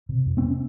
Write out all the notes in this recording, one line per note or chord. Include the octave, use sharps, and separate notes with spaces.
C3
F2
B3 C#4